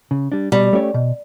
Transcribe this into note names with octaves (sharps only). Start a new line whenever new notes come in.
C#3
G3 D4
B2 G3
A3 C#4 G4 C#5
B2